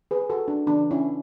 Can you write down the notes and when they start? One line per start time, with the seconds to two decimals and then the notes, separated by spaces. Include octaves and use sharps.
0.11 G#4 B4
0.30 F#4 A4
0.48 D4
0.66 C#3 E3 B3 D4
0.91 C#4 E4